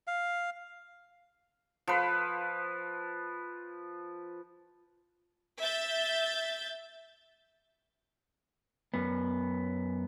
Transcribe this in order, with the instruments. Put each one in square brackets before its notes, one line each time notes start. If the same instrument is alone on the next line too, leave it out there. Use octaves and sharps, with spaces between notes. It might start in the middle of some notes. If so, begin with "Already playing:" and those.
[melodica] F5
[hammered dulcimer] F3 B4
[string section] E5 G6 A6
[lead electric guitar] F#2 B3